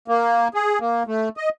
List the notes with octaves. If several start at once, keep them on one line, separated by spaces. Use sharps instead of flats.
A#3
G#4
A#3
A3
D#5